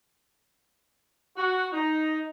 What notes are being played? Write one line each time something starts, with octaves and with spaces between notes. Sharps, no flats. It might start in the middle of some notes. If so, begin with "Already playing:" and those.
F#4
D#4